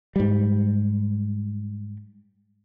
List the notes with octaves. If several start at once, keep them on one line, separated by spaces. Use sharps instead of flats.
G#2 G3